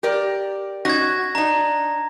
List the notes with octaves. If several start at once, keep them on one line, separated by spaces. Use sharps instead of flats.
G4 A#4 D5
C#4 D#4 F#4 G#6 A#6
D4 D#4 A#5